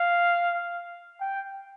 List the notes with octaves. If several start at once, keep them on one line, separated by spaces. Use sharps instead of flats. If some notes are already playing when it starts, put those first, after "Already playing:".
Already playing: F5
G5